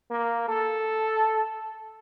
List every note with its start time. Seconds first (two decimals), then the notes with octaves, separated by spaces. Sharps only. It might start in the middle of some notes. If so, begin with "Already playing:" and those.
0.11 A#3
0.48 A4